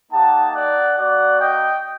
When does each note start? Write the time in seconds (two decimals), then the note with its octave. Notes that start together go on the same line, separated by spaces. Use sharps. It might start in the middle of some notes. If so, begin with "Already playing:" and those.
0.11 A#3 D#4 G4 F#5 A5
0.54 D5 F#5
0.98 A#3 F#4 D5 F#5
1.41 D#5 G5